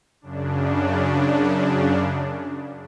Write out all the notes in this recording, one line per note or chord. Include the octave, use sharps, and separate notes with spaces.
F#2 C#3 D4